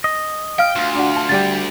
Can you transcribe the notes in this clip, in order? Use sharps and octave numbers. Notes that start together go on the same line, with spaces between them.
D#5
F5 G5 F6
D2 F4
D4 F#4
A5
D3 G3 G4 A6